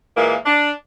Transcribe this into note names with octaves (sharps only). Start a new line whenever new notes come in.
A#2 E3 G#3 A#3
D4